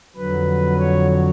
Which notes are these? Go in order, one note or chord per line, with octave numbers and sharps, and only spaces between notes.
F2 D3 F#3 B4
C#5